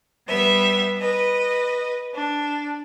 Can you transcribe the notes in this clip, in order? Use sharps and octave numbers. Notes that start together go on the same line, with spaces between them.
G3 B3 E5
B4 D#5
D4